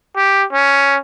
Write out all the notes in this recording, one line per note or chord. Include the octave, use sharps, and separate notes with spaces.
G4
C#4